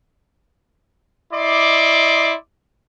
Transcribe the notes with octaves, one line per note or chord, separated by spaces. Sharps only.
E4 D5 D#5 C6 D6